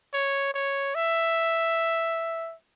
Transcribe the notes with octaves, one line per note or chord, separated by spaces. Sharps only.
C#5
C#5
E5